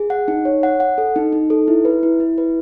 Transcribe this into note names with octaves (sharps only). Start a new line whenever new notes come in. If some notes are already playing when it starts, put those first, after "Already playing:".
Already playing: G#4
F#5
D#4
C#5
F#5
F#5
A4
D#4
D#4
A4
E4
B4
E4
E4
B4